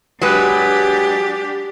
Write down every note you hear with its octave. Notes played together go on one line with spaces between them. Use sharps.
F#3 G#3 D4 G4 B4